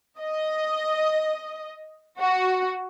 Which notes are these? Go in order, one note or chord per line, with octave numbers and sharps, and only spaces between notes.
D#5
F#4